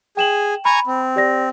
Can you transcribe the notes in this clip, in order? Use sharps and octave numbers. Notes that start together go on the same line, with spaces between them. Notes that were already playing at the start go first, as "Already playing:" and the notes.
G#4 G5 E7 F#7
G#5 A#5 B5 C#6
C4
G4 D5 A#6